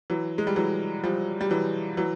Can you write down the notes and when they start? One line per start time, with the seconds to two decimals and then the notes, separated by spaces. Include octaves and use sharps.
0.10 E3 F#3
0.38 G#3
0.47 G3
0.56 E3 F#3
1.04 F3 G3
1.41 G3
1.50 E3 F#3
1.97 E3 F#3